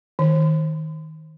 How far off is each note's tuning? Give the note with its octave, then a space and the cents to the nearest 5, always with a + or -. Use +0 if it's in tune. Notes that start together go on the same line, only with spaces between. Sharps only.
D#3 +20